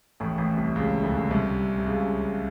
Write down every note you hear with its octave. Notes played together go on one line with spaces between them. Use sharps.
A1 A2
A1 A2
C2 C3
C#2 C#3
D2 D3
C2 C3
C3
C#2 C#3